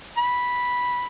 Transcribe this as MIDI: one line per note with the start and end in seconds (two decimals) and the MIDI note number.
0.18 1.06 83